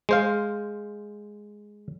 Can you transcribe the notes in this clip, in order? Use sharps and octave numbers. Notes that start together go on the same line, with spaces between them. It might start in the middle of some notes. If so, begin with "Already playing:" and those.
G#3 C5 F5